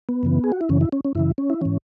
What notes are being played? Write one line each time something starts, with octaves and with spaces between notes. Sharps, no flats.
B3
F#2 C#3 E3
G#4
F#4
E4
F#2 C#3 E3 C#4
E4
C#4
C#4
F#2 C#3 E3 E4
C#4
E4
G#2 E3 C#4